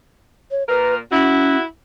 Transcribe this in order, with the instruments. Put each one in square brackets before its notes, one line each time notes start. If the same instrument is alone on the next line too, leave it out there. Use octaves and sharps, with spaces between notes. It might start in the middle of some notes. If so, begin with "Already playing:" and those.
[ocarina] C#5
[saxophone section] A#2 A#4 [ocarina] B4
[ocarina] C#4 [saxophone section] E4 F#4